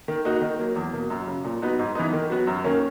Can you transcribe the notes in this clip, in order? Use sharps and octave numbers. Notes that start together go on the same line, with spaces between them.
D#3
A#3 D#4 F#4
D#3
F#3 A#3
E2
B2 A#3
F#2
C#3 F#3
A#2
F#3 B3 D#4 F#4
G#2
E3 B3 D#4
D#3
F#3 B3 F#4
F#2
D#3 A#3 C#4